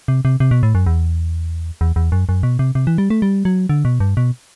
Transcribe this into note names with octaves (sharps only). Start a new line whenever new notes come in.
C3
C3
C3
B2
A2
F#2
E2
E2
E2
F#2
F#2
B2
C3
C3
E3
G3
A3
G3
F#3
D3
B2
G2
B2